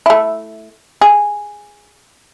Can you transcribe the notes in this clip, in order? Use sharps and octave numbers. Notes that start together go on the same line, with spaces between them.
A3 E4
G#4